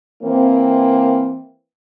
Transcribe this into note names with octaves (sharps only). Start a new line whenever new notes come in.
E3 A#3 C4